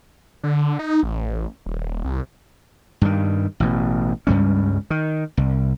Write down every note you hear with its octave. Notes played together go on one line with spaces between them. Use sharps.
D3
D#4
A1
D#1
C2
G2 D#3
A1 B2
C#2 G2 G3 C#4
D#3
C2